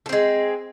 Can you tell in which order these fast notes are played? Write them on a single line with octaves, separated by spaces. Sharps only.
A3 C4 G#3